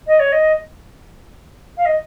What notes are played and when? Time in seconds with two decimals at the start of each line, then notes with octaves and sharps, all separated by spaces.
0.07 D#5
0.19 C#5
0.32 D#5
1.77 F5
1.85 D#5